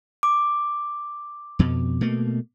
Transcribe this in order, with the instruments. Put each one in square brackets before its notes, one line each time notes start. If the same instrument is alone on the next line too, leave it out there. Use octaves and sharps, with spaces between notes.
[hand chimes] D6
[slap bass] F2 B2
B2 A3 A#3